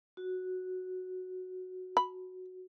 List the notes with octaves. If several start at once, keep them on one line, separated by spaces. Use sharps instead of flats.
F#4
B5